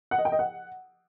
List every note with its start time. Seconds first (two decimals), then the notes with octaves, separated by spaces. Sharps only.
0.11 F#5
0.18 D#5
0.25 G5
0.32 D#5
0.39 F#5